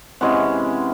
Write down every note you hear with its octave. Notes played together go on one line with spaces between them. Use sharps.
C3 E3 G#3 C#4 F#5